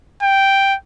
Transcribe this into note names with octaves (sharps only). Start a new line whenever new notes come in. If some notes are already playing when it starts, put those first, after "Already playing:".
G5